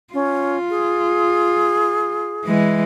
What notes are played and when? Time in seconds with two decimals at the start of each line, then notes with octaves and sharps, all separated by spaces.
0.14 C#4 F4
0.70 G#4
2.46 E3 G#3